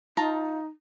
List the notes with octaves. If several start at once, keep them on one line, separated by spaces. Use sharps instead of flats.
D#4 F4 A5 A#5